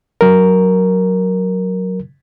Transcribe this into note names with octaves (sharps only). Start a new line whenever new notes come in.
F#3 A#4